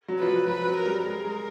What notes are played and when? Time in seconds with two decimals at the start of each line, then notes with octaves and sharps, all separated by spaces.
0.08 F#3
0.19 F3 B4
0.28 F#3
0.47 F#3 B4
0.67 F#3
0.76 A#4
0.86 G3
1.05 G#3 A#4
1.24 G#3